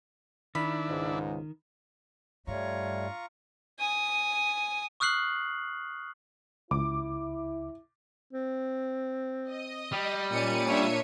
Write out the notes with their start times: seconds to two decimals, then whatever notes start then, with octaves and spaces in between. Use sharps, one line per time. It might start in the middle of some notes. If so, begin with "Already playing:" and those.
0.55 D#3 D4 E4 B5
0.89 C#2 G#2
2.47 G2 G3 A3 F4 C#5 A#5 C#6
3.80 G#5 D#6
5.00 C#6 D#6 F6 F#6 C7 F#7
6.71 C#2 E4 D6
8.33 C4
9.49 D#5
9.92 G3
10.29 A#2 C#4 C#7 D#7
10.66 D4 C#5 E5